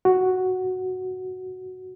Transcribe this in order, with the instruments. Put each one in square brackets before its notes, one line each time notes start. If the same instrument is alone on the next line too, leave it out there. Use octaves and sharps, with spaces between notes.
[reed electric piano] F#4